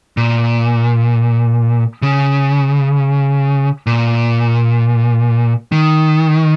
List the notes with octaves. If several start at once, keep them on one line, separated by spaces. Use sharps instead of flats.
A#2
C#3
A#2
D#3